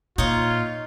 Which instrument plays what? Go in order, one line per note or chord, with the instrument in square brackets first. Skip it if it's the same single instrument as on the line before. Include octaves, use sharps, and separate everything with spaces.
[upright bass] A#2 [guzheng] D#4 C#5 [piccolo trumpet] F4